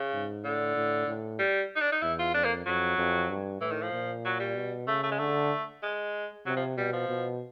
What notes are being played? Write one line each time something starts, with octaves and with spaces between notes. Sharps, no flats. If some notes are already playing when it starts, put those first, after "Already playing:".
Already playing: C#3
G#2
A2 D3
A2
A2
G3
D#4
D4
D#4
E2 E4
F4
F2 D4
A#3
F2 F#3
F2
G2
A2 E3
D#3
F3
A#2
F#3
G3
B2
C#3 A3
A3
G#3
D3 A3
G#3
C3 F#3
F3
B2 G3
F3
B2